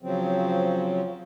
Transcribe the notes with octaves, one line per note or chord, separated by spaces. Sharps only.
C#3 F3 F#3 C4